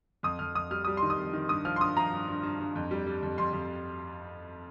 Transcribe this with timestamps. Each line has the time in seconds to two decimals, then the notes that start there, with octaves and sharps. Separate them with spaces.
0.23 F2 D#6
0.39 F2 F6
0.55 F2 D#6
0.71 G3 F6
0.85 G3 D#6
0.97 C6
1.03 D#3
1.10 D#6
1.17 F2
1.33 D#3
1.49 G2 D#6
1.65 F3 F6
1.76 C6
1.81 G2 D#6
1.97 F3 A#5
2.13 G2
2.28 G2
2.43 G2
2.60 G2
2.75 F2
2.91 G3
3.06 G3
3.23 F2
3.38 F2 C6
3.53 F2